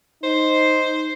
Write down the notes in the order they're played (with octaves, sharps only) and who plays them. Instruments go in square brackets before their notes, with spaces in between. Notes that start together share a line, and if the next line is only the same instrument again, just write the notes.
[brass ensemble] D#4 [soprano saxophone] C5